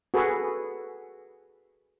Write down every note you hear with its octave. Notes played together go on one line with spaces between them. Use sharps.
F#4 G#4 A4 B4